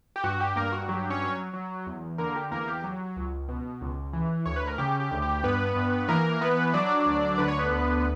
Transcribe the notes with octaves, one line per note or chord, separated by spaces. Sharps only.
G4
G2 F#4
G4
G2 A#3 A#4
F#4
F#3 G4
C#4 C#5
F#3
F#3
E2
D3 A#3 A#4
G4
E2 A#3 A#4
G4
F#3
C#2
B2
C#2
E3
D2 C#5
B4
A#4
C#3 G4
G4
D2
G4
G2 B3 B4
G2
E3 A#3 A#4
E3 B3 B4
F#3 D4 D5
D2
D3 B4
C#5
B3 B4
D2